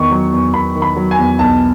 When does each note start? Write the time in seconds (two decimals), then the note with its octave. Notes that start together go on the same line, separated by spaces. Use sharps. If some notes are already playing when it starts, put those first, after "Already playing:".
Already playing: E2 D#3 C#6
0.11 F#3
0.32 E2
0.54 E2 B5
0.75 D#3
0.82 B5
0.96 F#3
1.11 G#5
1.18 E2
1.39 B1 A5